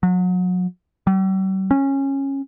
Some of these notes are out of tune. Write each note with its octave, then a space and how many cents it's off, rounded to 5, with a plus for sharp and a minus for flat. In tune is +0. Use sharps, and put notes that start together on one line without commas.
F#3 -35
G3 -45
C#4 -15